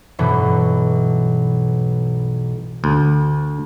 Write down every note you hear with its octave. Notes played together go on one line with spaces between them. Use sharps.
B1 G2 B2 E3
D2